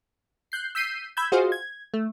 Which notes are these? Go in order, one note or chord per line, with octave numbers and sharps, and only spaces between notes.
F#6 G6 C7
E6 G6 B6 C7 D#7
B5 E6 G6 G#6
F4 F#4 G#4 C5 D#5 F5
G#6
A3